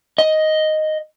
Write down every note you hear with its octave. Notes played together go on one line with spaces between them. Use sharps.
D#5